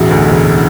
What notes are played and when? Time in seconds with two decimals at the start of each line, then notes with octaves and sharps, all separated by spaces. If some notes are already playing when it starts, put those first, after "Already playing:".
Already playing: E1 A1 E4 F#4
0.11 D2
0.28 E1